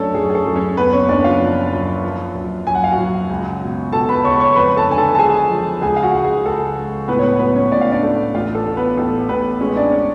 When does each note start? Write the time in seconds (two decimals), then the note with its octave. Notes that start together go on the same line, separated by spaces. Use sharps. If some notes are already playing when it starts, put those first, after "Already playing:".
Already playing: F#2 A3 C#4 D4 A4 C#5
0.14 F#2 G#4
0.30 G#4
0.35 A4
0.45 F#2
0.56 C#4 C#5
0.77 F#1 B3 B4
0.93 C#4 C#5
1.08 F#1 D4 D5
1.24 F4 F5
1.40 F3
1.73 F#2
2.04 F3
2.35 F#2
2.67 F#2 G#5
2.75 F#5
2.84 F5
2.92 F#4 F#5
2.98 F#2
3.29 C#2
3.62 B2
3.92 B2 A4 A5
4.09 B4 B5
4.24 C#2 C#5 C#6
4.35 B5
4.40 C#5 C#6
4.55 F2 B4 B5
4.76 A4 A5
4.88 D3 G#5
4.98 A4 A5
5.15 A5
5.19 F3 G#4 G#5
5.51 F3
5.81 C#2 G#4 G#5
5.96 F5
6.02 F#4 F#5
6.13 C#2
6.24 G#4
6.45 C#2 A4
6.77 C#2
7.08 A2 B3 B4
7.19 C#5
7.23 B3 B4
7.39 F#3 B3 B4
7.55 C#4 C#5
7.71 A2 D5
7.81 F5
7.92 D4 D5
8.03 A3
8.34 A1 F4 F5
8.55 A4
8.66 A1
8.77 B3 B4
8.97 A1 A4
9.29 A1 B3 B4
9.60 G#3 C#4 C#5
9.76 D4 D5
9.91 C#4 C#5